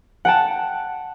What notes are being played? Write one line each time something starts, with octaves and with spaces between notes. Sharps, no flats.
F#5 G5 A5